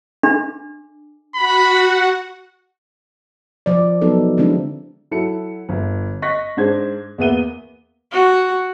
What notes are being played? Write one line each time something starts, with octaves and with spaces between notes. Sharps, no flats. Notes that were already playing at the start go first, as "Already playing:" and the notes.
D4
F#4 F#5 B5
F3 D5
F#3 B3 D#4 A4
D3 F3 G#3 C4 D4 E4
F#3 E4 A4 C#7
G1
D#5 C#6 F#6 A#6 B6
G#2 D4 C5 G#6
E2 A#3 B3 E5 D#7 G7
F#4